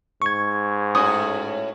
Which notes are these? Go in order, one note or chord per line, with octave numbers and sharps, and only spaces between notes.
G#2 C#6 G#6
A2 C#4 F#4 D#6